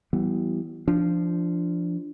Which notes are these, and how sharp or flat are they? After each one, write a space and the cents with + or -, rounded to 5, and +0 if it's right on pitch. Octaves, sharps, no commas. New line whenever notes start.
E3 +0 G3 -35 B3 +0
F3 -15 D4 +0